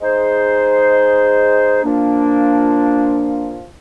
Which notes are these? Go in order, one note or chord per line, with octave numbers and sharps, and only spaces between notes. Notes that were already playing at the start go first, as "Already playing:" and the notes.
G#3 D#4 G#4 C5
A#2 F3 A#3 D4